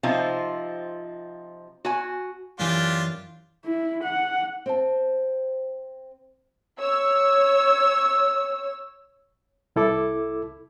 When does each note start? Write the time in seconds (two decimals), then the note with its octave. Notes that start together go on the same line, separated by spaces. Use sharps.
0.03 C3 F3 C4 D#4 F4
1.85 F#4 G#5
2.59 F#2 E3 D4 F4 G4
3.65 E4
4.03 F#5
4.66 C4 C5 A5
6.79 C#5 E6
9.76 C2 E4 A4 D6